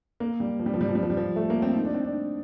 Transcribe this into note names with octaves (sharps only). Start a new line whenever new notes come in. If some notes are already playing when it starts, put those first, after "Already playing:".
A#3
G3
F3
G3
F3
G3
F3
G3
F3
G3
F3
A3
A#3
C4
D#4
D4
C4
D4